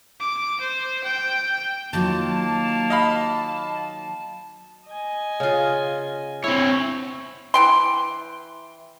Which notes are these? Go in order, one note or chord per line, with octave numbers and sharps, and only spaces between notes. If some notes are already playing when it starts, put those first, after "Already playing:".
D6
C5
G5
D#3 F#3 A#3 F4 A5
D#5 F5 B5
D#5 G#5
C#3 F4
C4 E4 C#5
E3 G5 C6